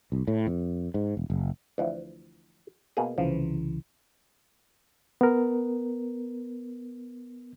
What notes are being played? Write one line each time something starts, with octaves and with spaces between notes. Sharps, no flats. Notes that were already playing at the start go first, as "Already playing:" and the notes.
C2
A2
F2
G#2
E1
F#1
D2 E3 F3
B2 A#3 G#4
C2 C#3 E3 F3
B3 A#4